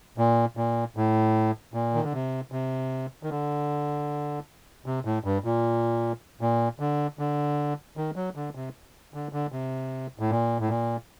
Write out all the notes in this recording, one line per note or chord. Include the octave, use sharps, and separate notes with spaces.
A#2
A#2
A2
A#2
D#3
D3
C3
C3
D#3
D3
C3
A2
G2
A#2
A#2
D3
D3
D#3
F#3
D3
C3
D3
D3
C3
A2
A#2
A2
A#2